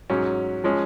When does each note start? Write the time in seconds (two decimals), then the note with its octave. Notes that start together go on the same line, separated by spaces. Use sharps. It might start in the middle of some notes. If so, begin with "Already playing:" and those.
0.10 G#2 F#3 C#4
0.64 F3 G#3 C#4